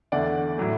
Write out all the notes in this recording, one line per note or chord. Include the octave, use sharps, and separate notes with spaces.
E2 D3 A3 D5 F#5
A2 F#3 A3